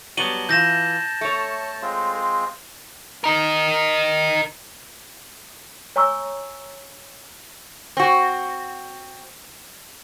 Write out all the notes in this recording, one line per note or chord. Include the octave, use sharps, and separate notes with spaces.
F#3 G3 B3 A5 D#7 F#7 G7
E3 F4 G6 A#6 E7
A3 C#5
G#3 C4 F4
A#4 D#5
C#5 G#5 A#5 C#6 E6
C4 F#4